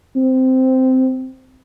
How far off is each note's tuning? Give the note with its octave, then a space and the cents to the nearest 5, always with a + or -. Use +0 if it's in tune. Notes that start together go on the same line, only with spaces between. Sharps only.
C4 -10